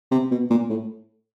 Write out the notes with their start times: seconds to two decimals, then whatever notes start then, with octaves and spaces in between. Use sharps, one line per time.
0.11 C3
0.31 B2
0.50 A#2
0.70 A2